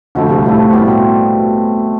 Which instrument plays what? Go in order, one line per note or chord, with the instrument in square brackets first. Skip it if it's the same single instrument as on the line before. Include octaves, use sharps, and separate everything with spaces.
[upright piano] D2 D3 [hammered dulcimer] F3 A3 E4
[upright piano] C2 C3
[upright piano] A2 [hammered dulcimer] F3 A3 E4
[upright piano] A2
[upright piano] A2 [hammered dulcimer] C3 G3 B3 F4
[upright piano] B2